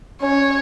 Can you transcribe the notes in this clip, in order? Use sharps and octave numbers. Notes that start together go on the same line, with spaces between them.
C#4 C#5